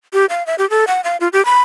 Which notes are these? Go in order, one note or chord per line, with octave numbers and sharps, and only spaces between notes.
G4
F5
E5
G4
A4
F#5
F5
F4
G4
B5